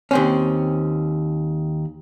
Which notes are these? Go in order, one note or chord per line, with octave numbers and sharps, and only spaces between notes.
D#2 C4 C#4